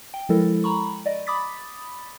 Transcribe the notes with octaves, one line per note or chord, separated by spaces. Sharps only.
G5
F3 G#3 E4 A4 A#4
A#5 B5 C#6
D5 D#5
B5 D6 D#6 A6 B6